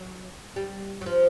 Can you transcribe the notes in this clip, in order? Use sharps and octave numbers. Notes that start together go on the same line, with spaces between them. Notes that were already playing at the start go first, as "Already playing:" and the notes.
Already playing: F#3
G3
F#3
F3